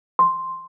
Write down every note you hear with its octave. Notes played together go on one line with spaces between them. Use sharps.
C6